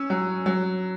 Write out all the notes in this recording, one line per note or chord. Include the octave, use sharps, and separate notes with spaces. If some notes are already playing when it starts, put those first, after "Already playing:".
Already playing: C#4 E6
F#3
F#3